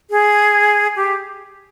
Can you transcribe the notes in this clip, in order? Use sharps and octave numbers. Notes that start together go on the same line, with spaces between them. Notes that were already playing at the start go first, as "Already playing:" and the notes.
G#4
G4